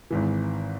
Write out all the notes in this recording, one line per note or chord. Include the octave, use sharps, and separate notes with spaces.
G#1 G#2 E3